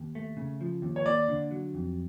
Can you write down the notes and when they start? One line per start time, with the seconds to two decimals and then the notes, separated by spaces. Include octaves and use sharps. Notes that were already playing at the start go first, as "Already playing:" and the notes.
Already playing: D#2
0.15 A3
0.37 C#3
0.61 F3
0.82 D#2
0.96 C#5
1.06 A#3 D5
1.28 D3
1.51 F#3
1.74 F2